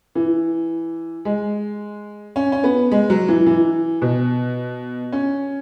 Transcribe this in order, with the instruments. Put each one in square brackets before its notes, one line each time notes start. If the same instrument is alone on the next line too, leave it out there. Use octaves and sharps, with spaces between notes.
[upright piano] E3
G#3
C#4
C#4
B3
G#3
F#3
E3
E3
B2
C#4